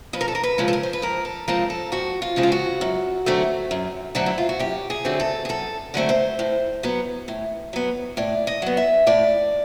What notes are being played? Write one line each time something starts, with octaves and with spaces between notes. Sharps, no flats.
F2 B4
A#4
A4
A#4
B4
C#3 F3 G#3 C4
A4
A#4
C5
B4
F2 A#4
A4
C#3 F3 G#3 C4 A#4
A4
F2 F#4
F4
C#3 F3 G#3 C4
F4
F#4
F#2
D3 F#3 A3 C4
F#2
D3 F#3 A3 C4 D#4
E4
F4
F#4
F#2 G4
G#4
D3 F#3 A3 C4
A4
G#4
F#2 A4
D3 F#3 A3 C4
C5
A2
F#3 B3
A2
F#3 B3
A2 D5
D#5
F#3 B3
E5
A2 D5